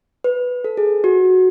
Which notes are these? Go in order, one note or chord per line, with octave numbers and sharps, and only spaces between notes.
B4
A4
G#4
F#4